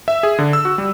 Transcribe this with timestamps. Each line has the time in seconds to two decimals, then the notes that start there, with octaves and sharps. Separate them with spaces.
0.08 E5
0.23 G#4
0.39 D3
0.53 E6
0.65 F#4
0.78 G3